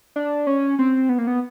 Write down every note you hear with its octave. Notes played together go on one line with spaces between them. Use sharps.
D4
C#4
C4
B3
A#3
B3